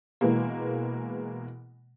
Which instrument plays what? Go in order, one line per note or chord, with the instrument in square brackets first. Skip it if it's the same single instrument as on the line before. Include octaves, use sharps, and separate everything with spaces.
[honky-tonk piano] B2 E3 G#3 A#3